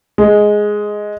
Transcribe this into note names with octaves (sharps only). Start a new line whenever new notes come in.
G#3